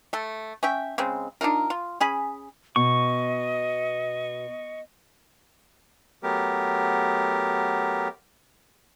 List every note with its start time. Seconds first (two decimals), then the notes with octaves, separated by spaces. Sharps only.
0.13 A3 A4
0.63 C#4 E5 G5
0.98 C#3 G#3 C4
1.41 D4 D#4 F4 A#4
1.70 F4
2.00 C#4 G#4 B5
2.76 B2 D#5 C#6
6.23 F#3 A3 B3 G4 A#4